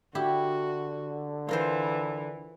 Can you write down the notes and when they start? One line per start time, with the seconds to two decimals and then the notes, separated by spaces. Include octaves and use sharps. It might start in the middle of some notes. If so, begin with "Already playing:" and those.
0.15 D3 E4 F#4 G4
1.49 E3 F4 A#4 C5